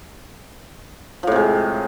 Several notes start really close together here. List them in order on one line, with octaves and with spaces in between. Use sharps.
F3 A2 C3 G#3